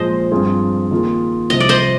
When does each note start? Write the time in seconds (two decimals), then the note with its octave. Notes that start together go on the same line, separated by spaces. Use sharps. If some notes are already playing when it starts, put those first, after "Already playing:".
Already playing: A#2 F3 G#3 C5 D#5
0.32 G2 F3 C4 F4 G#4
0.91 D#3 A#3 F4 G#4
1.50 C2 C3 F3 D#5
1.60 D5
1.69 C5 D#5